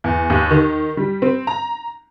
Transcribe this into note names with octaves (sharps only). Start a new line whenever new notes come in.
E2
D#2
D#3
G3
C4
A#5